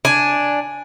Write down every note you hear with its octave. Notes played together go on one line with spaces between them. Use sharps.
D4 G#5